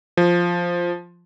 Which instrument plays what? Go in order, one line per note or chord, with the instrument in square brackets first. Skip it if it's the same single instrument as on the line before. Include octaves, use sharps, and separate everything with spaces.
[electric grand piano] F3